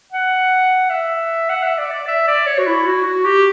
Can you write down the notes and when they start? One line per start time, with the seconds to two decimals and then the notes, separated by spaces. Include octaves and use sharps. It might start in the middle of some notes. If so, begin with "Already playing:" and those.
0.13 F#5
0.90 E5
1.49 F#5
1.63 E5
1.78 D5
1.93 D5
2.07 E5
2.27 D5
2.47 C#5
2.59 F#4
2.67 E4
2.86 F#4
3.05 F#4
3.25 G4